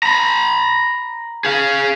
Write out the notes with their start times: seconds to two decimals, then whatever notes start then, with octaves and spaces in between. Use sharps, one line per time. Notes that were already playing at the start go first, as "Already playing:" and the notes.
0.03 A#5 B5
1.45 G#4 F5